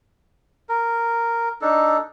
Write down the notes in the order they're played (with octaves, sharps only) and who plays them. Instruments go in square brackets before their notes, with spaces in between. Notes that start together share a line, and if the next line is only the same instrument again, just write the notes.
[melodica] A#4
D4 D#4 A4